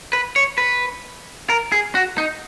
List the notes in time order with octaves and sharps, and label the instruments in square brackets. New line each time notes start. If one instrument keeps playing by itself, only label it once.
[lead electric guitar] B4
C#5
B4
A#4
G#4
F#4
D#4